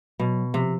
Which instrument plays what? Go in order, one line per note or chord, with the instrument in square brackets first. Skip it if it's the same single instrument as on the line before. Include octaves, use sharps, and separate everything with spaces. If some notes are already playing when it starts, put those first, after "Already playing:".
[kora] B2 [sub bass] F#3
[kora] C3 [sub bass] F3